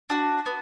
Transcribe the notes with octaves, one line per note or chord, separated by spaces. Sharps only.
D4 F#4
B3